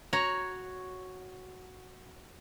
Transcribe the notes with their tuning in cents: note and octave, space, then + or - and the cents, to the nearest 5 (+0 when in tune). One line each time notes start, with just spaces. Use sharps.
F#4 +0 C#5 +0 A#5 +5